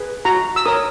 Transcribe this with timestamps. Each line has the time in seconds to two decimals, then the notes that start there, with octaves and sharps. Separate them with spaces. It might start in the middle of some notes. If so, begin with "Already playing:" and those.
Already playing: G#4 B4
0.25 F#4 A#5
0.56 E6
0.65 A#4 C#5 D#6